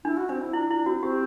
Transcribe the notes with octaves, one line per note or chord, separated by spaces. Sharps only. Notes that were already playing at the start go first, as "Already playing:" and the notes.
D4 E4
F#4
C4 D4
E4
D4 E4
D4 E4
C4 F#4
C4 G4